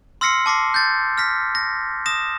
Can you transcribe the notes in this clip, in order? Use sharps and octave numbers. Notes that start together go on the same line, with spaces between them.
C6 E6 F6 A#6 C7 C#7
A5 D6 A#6 C7
G6 A6
F6 A#6 B6
A#6
D#6 A#6 E7